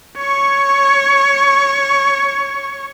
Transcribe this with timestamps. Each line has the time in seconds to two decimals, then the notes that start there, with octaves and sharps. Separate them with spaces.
0.18 C#5 C#6